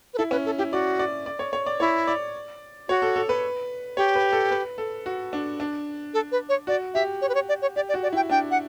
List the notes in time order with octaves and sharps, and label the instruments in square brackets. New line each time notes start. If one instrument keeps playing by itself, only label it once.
[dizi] B4
[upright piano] E4 [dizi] A4
[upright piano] C#4 [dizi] B4
[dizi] A4
[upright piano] E4 [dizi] G4
[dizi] F#4 [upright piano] D5
[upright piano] D5
D5
C#5
C#5
D5
[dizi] E4 [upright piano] C#5
[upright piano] D5
[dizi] F#4 [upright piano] C#5
[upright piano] A4
A4
B4
[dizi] G4 [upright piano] C#5
[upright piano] B4
A4
B4
A4
F#4
D4
D4
[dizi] A4
B4
C#5
[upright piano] F#4 [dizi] D5
[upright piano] G4 [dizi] E5
[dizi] C#5
B4
C#5
D5
C#5
[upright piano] G4 [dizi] D5
[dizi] D5
[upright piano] F#4
[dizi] D5
[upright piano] E4 [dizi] G5
[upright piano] D4 [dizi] G5
[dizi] F#5